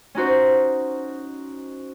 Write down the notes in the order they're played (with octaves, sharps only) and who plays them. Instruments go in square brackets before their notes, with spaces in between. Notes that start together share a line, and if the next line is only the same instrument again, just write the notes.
[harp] C#4 D#4 F#4 C5